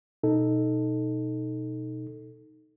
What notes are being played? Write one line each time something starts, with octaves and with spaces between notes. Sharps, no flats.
B2 D#4 A4